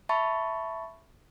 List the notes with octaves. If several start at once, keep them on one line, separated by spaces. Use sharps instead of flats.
E5 A5 B5 C#6 A6